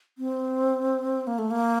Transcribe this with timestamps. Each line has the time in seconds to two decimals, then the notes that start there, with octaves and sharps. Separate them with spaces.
0.18 C4
1.27 A#3
1.38 A3
1.51 A#3